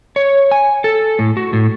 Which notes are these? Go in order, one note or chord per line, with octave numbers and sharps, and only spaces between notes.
C#5
G#5
A4
A2
F#4
A2